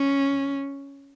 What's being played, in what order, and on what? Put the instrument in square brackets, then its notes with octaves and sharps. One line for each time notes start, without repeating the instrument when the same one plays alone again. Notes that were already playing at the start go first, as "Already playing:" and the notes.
Already playing: [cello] C#4